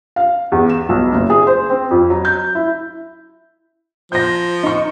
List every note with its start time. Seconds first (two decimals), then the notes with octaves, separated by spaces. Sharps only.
0.16 F5
0.52 E2
0.69 E7
0.89 B1
1.13 F#1
1.30 G#4
1.47 C5
1.70 C4
1.91 F2
2.10 F#3
2.25 G6
2.55 E4
4.12 F3 G6 A#6
4.63 D#4 C#6